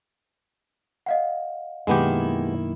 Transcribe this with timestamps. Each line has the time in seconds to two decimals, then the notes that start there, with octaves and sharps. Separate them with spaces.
1.06 D#5 F5 F#5
1.87 F#2 B2 D#3 G#3 A#3 B3 E4 G4